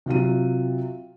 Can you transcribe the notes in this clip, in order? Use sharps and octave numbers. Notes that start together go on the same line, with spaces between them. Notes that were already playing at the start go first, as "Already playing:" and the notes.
C3 F#3 F4 D#7